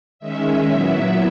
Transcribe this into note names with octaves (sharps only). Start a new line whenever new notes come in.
D#3 G#3 C#4 E5
A#2 F#3 B3 E4